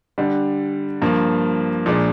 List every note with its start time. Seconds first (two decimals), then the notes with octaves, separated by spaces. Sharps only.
0.18 D3 G3 D4
1.02 G2 F3 A#3
1.86 A#2 F3 G#3 D4